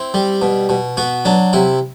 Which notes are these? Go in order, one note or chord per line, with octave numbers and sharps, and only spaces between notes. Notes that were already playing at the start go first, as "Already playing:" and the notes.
Already playing: C4 E4
G3
B2
B2
B3 F#4
F#3 D4
C3 E4